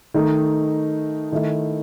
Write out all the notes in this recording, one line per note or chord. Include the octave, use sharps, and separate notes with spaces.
D#3 A3 D#4
D#3 A3 E4